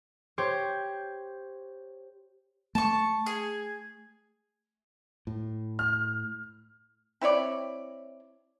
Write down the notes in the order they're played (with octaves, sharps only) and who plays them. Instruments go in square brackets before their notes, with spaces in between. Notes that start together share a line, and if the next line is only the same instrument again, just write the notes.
[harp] G4 C5 C#5
[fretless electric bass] A3 [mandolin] A5 C#6
[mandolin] G#4
[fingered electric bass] A2
[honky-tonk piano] F6
[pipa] C4 E4 C#5 D5